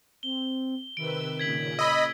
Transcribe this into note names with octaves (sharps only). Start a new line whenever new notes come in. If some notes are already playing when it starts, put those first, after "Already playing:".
C4 G7
C3 D#3 B4 E6 D7
A#2 C#3 G#6 B6 F#7
D#5 B5 E6